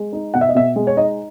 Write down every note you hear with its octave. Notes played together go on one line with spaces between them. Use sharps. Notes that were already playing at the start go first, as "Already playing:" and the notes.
Already playing: G#3
D#4
B2 F#5
E5
D#5
B2 E5
G#3
C#5
D#4 D#5